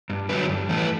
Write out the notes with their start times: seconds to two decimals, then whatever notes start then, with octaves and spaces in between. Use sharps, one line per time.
0.10 G2
0.29 D3 F#3 B4
0.49 G2
0.69 E3 A3
0.77 B4